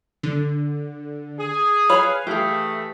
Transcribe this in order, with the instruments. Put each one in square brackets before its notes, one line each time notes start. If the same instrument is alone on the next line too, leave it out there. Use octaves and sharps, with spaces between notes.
[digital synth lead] D3
[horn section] G#4
[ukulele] B4 C#5 B5 [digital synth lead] F5
[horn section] E3 A3 [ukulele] G4 G#4